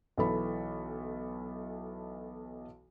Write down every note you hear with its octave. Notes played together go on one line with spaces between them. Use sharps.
B1 E3 A4 B5